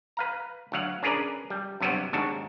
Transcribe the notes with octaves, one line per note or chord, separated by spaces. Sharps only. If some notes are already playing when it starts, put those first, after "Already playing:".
B4 F5 A#5
D2 F#3 F5 F#5
C#4 D4 G#4 A#4 B4 D5
G3
G2 C3 F#3 G3 B3
D#2 G#2 D4 F#4 A5